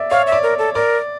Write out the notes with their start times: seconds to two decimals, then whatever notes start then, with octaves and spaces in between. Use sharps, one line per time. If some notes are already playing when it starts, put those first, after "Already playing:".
Already playing: D5 E5
0.11 C#5 F5
0.27 E5
0.32 D5
0.43 A#4
0.59 A4
0.75 A#4 D5